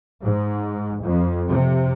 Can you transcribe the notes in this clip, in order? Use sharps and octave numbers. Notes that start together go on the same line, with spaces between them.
G#2
F2
C3